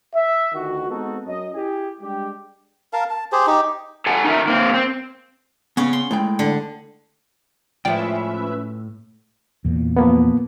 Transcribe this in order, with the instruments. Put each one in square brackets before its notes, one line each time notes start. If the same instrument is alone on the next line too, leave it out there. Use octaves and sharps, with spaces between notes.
[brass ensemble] E5
D2 D#3 F4 F#4
G#3 B3 C4 D#4 F#4 A4
F#2 D#5
E4 G4 G#4
G3 G#3 D4 G4
[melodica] A#4 F5 A5
A5
G4 G#4 C5
D#4 G4
[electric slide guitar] A4 F#5 G#5 A5
D#4 A#4 E5
A#3 C4
C4
[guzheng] C#3 C#4 [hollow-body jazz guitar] B3
[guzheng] C6
[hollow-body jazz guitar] A2 G#3 G5
[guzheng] D3
[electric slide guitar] A2 [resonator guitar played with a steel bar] F3 G#3 [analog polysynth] C#4 B4 E5 [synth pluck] D5 G5
[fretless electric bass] E2 A#2
[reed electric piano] F3 A#3 B3